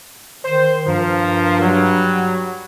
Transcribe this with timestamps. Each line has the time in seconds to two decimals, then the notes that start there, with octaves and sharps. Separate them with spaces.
0.45 D#3 C5
0.87 G2 F3 A#4
1.61 F#3 G3